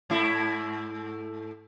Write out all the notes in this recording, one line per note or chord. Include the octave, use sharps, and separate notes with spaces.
G#2 A3 E4